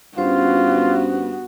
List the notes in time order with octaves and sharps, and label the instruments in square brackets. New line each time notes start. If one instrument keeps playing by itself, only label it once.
[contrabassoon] G2 [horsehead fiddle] B3 F#4 [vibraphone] C#4 C5 [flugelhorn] F4